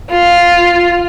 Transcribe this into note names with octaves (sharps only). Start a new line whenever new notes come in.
F4